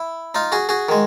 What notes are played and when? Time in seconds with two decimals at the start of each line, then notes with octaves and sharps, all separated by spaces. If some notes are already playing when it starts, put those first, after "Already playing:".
Already playing: E4
0.35 D#4 F4
0.52 F#4 G#4
0.69 F#4 G#4
0.89 D#3 G#3